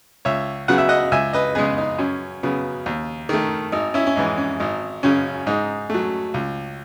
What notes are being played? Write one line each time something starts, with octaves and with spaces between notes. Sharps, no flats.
C#2 C#5 E5
C#3 F#3 B3 F#5
E5
D#5 F#5
C#2 E5 G#5
B4 D#5
C#3 G#3 B3 G#4 B4
D#4
F#2 C#4
C#3 F#3 B3
D#2
D#3 A3
G#1 D#4
C#4 E4
C#4
G#2 E3 D#4
C#4
G#1 D#4
F#2 C#3 C#4
G#2 D#4
F#3 A3
C#2